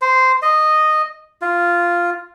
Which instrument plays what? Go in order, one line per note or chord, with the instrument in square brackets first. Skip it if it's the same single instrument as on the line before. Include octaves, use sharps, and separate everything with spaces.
[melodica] C5
D#5
F4